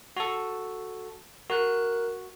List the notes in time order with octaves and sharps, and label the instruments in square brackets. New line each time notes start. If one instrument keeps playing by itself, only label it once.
[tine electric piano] F#4 A4
[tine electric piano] F#4 [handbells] A#4 F#6